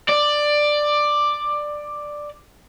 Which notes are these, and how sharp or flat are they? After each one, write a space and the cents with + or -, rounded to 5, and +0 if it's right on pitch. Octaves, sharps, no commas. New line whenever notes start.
D5 +10